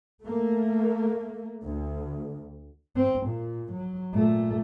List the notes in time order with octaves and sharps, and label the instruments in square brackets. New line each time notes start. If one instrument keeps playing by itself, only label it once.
[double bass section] A3 A#3
D2
[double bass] C4
A#2
F#3
A#2 A3